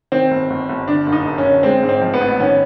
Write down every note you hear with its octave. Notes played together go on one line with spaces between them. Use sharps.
D#3 C4
G1
G1
G1
D3 D4
F#1
D#4
F#1
C#4
D3
G#3 C4
G#2
C4
F3
B3
A1
D#3 C#4